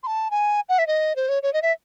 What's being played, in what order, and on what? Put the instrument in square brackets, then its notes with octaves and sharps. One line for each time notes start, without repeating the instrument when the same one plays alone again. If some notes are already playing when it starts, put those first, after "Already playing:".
[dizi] C6
A5
G#5
F#5
E5
D#5
C5
C#5
C#5
D#5
E5